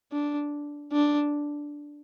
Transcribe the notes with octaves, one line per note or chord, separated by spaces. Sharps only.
D4
D4